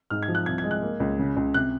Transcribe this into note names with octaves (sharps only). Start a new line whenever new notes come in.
G#2 F6
G#6
F3
F#6
C2 G#6
G#6
G#3
F#6
A#3
C#2
C#3
C#2
C3 F#6